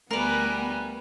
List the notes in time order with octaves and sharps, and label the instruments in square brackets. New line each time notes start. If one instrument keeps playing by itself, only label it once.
[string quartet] D2 G3 G#5 [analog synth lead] A3 [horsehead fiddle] B3 [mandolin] A#4 B4